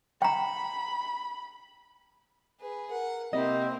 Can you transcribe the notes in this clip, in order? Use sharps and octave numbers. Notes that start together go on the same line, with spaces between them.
G5 A#5 B5
G#4 B4
A#4 F#5
C3 A#3 C4 E4 D#5